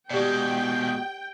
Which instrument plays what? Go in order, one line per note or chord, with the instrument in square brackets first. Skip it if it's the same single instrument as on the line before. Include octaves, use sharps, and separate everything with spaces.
[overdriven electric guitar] B2 G#3 [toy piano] G4 D5 [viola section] G5